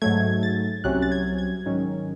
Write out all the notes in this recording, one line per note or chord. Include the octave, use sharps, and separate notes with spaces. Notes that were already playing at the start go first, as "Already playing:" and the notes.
G#2 F#3 A3 G#6
A6
C2 C3 F#3 C#4 F#6
A6
G#6
G#6
G#2 D#3 F#3 C#4